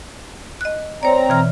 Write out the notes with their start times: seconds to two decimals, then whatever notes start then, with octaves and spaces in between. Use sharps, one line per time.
0.61 D#5 F#6
1.03 C4 C#5 D5 A#5
1.29 B2 E3 F6